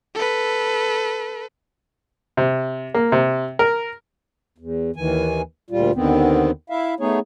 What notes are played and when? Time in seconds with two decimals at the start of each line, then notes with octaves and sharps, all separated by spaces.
0.15 A4 B4
2.37 C3
2.94 A#3
3.12 C3
3.59 A#4
4.58 E2
4.96 D#2 D#3 E3 G#5
5.71 D2 A#2 G3 F4
5.95 D#2 D3 D#3 B3 C4
6.70 E4 E5 F5
7.00 A3 B3 D#4 G#4 C#5